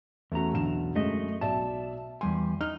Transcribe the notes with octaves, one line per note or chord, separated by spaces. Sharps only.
E2 A3 C#4 F#4 A#5
B1 D3 E7
F#2 G#3 A3 D#5
B1 D5 E5 A5
E2 G3 G#5 C6
D#4 F6